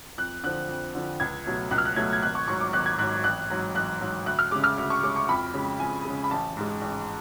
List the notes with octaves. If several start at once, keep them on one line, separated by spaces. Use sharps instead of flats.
F2 F#6
D3 F3 F#6
F2
D3 F3
C#2 G#6
B2 F#3 A3
C#2 F#6
F6
F#6
B2 F#3 A3 G#6
G#6
G#1 F#6
C#6
G#2 F#3 C#6
D6
G#1 F#6
G#6
G#2 F#3 F#6
A1 F#6
G#2 F#3
A1 F#6
G#2 F#3
D2 F#6
F6
C#3 G#3 D6
F6
D2
C#6
C#3 G#3 D6
C#6
F2 B5
C#3 G#3
F2 G#5
C#3 G#3
B5
A1 A5
G#2 G#3
A1